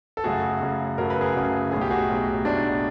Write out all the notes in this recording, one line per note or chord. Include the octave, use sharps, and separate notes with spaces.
A4
F#2 C#3 F#3 A3 F#4 G#4
F#2 C#3 F#3 A3
F#2 C#3 F#3 A3 A#4
B4
G#4 A#4
F#2 C#3 F#3 A3
B1 A2 F#3 G#4
G4
F#4 G#4
B1 A2 F#3
B1 A2 F#3 D4